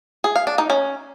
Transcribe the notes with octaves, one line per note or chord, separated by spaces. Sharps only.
G#4
F5
D4
D#4
C#4